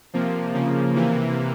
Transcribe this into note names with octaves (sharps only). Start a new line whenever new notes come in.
C3 F3 A#3
C#3 F3 A#3
C3 E3 A#3